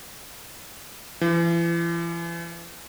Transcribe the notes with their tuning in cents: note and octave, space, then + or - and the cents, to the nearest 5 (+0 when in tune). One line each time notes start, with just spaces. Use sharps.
E3 +40